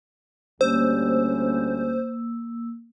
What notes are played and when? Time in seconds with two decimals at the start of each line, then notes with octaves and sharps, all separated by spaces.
0.61 D2 G3 A#3 C#4 C5 E6